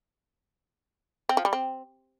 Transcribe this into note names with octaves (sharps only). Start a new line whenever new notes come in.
C4
F3
G3
C4